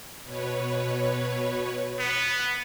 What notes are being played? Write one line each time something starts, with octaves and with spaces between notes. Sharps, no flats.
B2 B4 C#5
B3